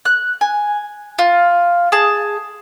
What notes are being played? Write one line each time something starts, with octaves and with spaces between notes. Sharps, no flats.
F#6
G#5
F4
G#4 A5